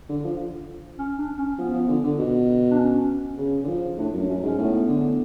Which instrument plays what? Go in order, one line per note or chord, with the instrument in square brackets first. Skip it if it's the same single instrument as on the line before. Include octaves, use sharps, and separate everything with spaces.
[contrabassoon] D3
F3
[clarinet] C#4
D4
C#4
[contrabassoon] F3 [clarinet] B3
[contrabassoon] F3
D3
D3
B2
[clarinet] D4
C#4
[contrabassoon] C#3
D3
F3
[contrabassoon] A2 [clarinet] D4
[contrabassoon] F#2
[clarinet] D4
[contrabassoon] F#2 [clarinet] C#4
[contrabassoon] G#2 [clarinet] C#4
[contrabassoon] A2 [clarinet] B3
[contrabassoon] D3